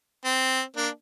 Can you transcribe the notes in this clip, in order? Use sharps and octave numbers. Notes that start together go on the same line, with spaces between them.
C4
A#3 D4